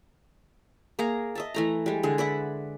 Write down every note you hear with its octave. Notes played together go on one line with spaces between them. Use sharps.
A#3 G#4 A#5
D#5 E5 A5
E3 A3 A#5
G3 G#3
D3 G#3 G#4
B4 D5 E5 F#5